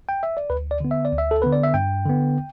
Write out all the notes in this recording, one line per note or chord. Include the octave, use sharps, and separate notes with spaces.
G5
E5
D5
D2 B4
D5
D3 B3
E5
D5
D2
E5
A4
D3 B3 B4
D5
E5
G2 G5
D3 B3